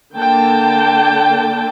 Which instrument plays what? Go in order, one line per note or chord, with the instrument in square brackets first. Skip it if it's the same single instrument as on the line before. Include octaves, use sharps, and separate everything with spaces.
[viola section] D3 A#3 G5 A5